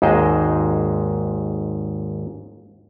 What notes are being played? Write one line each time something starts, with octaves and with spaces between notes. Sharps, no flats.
G#1 D#2 G#2 G#3 C5 D#5